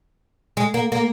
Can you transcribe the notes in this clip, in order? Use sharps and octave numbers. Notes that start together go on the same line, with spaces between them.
G#3
A#3
A#3